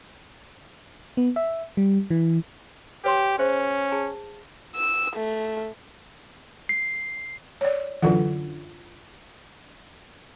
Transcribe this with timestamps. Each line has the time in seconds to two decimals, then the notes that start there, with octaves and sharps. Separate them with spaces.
1.17 B3
1.36 E5
1.77 G3
2.11 E3
3.04 G4 B4 C#5 C6
3.39 C#4 G#4 C5 E5
3.92 G#4 A5 A#5
4.76 E6
5.16 A3
6.69 C7
7.61 C#5 D5
8.02 F#2 D3 E3 F4 F#5